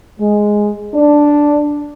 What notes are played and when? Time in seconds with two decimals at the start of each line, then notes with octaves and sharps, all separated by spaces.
0.19 G#3
0.94 D4